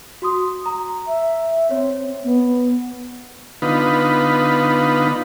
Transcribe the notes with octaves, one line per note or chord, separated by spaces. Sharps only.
F#4 C6 D#6
A#5
E5
C4 C#5
B3
D3 B3 D#4 F4 B4